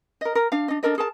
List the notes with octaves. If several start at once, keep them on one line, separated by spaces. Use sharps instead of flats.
A#4 D#5
A#4
D4 F5
D4 D#5
D4 A4 A#4 D#5
G#4 A#4 A5